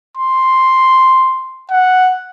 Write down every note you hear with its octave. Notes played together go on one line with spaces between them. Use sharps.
C6
F#5